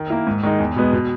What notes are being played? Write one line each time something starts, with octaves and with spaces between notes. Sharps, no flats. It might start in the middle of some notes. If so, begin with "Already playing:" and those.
Already playing: D#3
A#3 E4
G#2
D#3 G#3 D#4
E2
B2 G#3 B3
B2